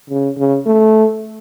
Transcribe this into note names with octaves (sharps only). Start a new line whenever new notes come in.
C#3
C#3
A3